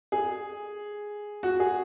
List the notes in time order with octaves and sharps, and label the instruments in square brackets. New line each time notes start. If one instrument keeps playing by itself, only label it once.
[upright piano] G#4
F#4
G#4